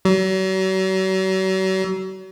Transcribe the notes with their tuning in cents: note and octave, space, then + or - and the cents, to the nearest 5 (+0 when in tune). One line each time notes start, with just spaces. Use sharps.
F#3 +40